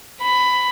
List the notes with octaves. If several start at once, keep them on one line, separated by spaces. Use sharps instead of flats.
B5